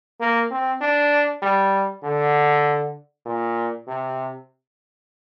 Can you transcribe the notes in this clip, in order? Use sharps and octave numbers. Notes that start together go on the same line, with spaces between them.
A#3
C4
D4
G3
D3
A#2
C3